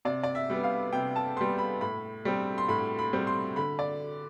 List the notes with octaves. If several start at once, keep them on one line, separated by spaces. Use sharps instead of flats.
C3 D5
D5
E5
G3 B3
F5
C3 G5
A5
G3 B3 C6
B5
A2 B5
G3 C4
C6
A2 B5
B5
G3 C4
C6
D3 B5
D5